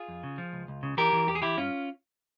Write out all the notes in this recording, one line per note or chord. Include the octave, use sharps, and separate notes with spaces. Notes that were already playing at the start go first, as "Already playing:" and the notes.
Already playing: F4 G#4
F2
C#3
F3
C#2
C#2
C#3
E3 G4 A#4
E3
E2 G4
G#4
E3 E4 G4
G2 C#4 F4